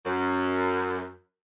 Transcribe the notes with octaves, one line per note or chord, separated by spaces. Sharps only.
F#2